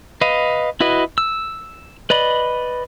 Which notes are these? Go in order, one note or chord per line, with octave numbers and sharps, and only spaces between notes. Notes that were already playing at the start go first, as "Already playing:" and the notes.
B4 D#5 F5
E4 F#4 B4 D#5
E6
B4 D5 D#5 B5